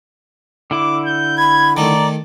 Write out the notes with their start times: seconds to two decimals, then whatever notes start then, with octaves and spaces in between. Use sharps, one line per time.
0.71 D3 E4 D6
1.05 G6
1.38 B5 G#6
1.77 D#3 A3 D5 A#5